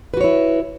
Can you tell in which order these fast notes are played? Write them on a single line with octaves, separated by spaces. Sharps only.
B4 F#4 C#5 E4